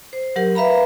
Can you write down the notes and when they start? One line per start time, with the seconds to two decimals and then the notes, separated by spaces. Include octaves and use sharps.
0.13 C5
0.36 F#3 G4 A#4 F#5
0.55 B4 E5 F5 A#5 B5